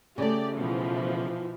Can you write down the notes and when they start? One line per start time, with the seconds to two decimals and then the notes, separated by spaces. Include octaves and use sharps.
0.18 C#3 A3 G4 D5
0.56 B2 E3 F3